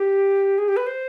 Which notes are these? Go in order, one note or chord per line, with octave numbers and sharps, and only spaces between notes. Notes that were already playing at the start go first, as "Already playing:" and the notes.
Already playing: G4
G#4
G4
B4
C5